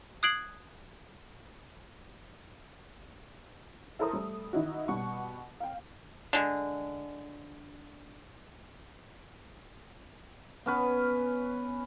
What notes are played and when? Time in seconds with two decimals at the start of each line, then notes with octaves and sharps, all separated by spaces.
0.23 D#6 F#6 G#6 C7 D7 F#7
3.99 E4 A4 A#4 C5 A#5 D#6
4.13 G3 A3
4.53 D#3 D#4 E4 F#4
4.88 B2 G3 F#5 C#6
5.60 F5 G5
6.33 D3 G#3
10.66 B3 C#4 B4